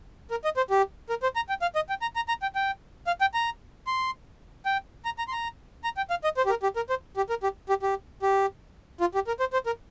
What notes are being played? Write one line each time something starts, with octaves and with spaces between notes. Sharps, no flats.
A#4
D#5
C5
G4
A#4
C5
A#5
G5
F5
D#5
G5
A#5
A#5
A#5
G5
G5
F5
G5
A#5
C6
G5
A#5
A#5
C6
A#5
A#5
G5
F5
D#5
C5
G4
A#4
G4
A#4
C5
G4
A#4
G4
G4
G4
G4
F4
G4
A#4
C5
C5
A#4